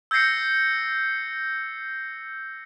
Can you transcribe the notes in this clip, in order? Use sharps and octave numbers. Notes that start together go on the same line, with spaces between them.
E6 G6 G#6 A#6 C7 C#7